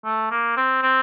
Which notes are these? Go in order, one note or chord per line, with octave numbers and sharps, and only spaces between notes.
A3
A#3
C4
C4